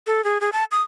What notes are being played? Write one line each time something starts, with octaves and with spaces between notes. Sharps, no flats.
A4
G#4
G#4
A5
D#6